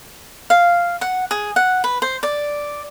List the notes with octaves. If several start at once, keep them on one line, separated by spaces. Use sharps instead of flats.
F5
F#5
G#4
F#5
B4
C5
D5